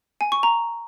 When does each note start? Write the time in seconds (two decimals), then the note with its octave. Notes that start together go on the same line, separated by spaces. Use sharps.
0.21 G#5
0.32 C#6
0.43 A#5